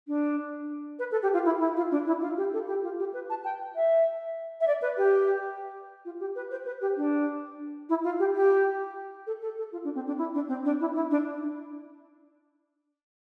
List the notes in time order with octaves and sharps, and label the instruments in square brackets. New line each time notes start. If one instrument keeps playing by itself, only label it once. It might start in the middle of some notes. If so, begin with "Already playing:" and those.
[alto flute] D4
B4
A4
G4
F4
E4
E4
F4
D4
E4
F4
G4
A4
G4
F4
G4
B4
A5
G5
E5
E5
D5
B4
G4
F4
G4
B4
C5
B4
G4
D4
E4
F4
G4
G4
A4
A4
A4
F4
D4
C4
D4
E4
D4
C4
D4
E4
E4
D4